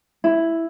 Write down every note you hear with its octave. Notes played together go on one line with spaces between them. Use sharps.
E4